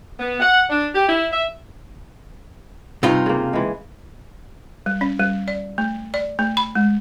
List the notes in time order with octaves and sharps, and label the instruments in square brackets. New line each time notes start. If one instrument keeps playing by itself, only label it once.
[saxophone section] B3
F#5
D4
G4
E4
E5
[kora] G2 [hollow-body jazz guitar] C3 D#4 F4
[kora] C#3 A#3
E3 G#3
[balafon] G3
C#4
G3
D5
A3
D5
A3
B5
G#3